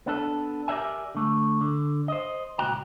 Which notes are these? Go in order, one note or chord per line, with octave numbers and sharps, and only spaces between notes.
B3 D4 A4
G4 A#4 C#5 D5 E5 G#5
D3 A3
D3
C5 D#5
C#2 A#2 F#4 G5 A#5